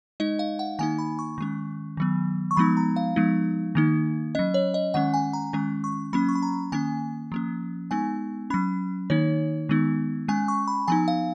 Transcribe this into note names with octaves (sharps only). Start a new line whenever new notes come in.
G#3 D#4 D#5
F5
F#5
D#3 A#3 D#4 G#5
B5
C#6
D#3 G#3 C#4
D#3 F#3 B3
C#6
F3 G#3 B3 D#4 B5
A#5
F5
F3 G#3 B3 D#4
D#3 A#3 D#4
F#3 C#4 D#5
C#5
D#5
D#3 G#3 C#4 F#5
G#5
A#5
D#3 G#3 C#4
C#6
F#3 A#3 C#4 B5
C#6
B5
A#5
D#3 A#3 C#4 G#5
F3 A#3 C#4
G#3 B3 D#4 G#5
F#3 C#4 B5
D#3 A#3 D#4 C#5
D#3 G#3 B3 D#4
G#3 C#4 G#5
C#6
B5
F3 B3 D#4 G#5
F5